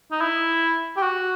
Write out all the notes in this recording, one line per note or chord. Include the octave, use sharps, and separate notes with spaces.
D#4
E4
G4
F#4